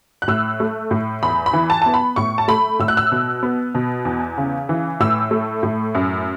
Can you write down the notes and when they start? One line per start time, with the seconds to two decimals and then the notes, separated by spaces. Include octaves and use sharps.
0.22 F#6
0.28 A2 E6
0.60 A3
0.91 A2
1.23 E2 B5
1.46 B5
1.53 E3
1.70 A5
1.82 B3 A5
1.94 B5
2.16 A2 C#6
2.38 A5
2.48 A3 B5
2.79 A2 E6
2.88 F#6
2.97 E6
3.12 B2
3.43 B3
3.75 B2
4.05 E2
4.38 C#3
4.69 E3
5.00 A2 E6
5.31 A3
5.63 A2
5.95 F#2